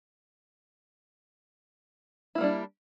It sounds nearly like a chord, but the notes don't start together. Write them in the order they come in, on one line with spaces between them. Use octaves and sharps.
E4 A#3 G3 D4